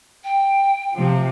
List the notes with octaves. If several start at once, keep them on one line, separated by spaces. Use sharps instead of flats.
G5
C3 F3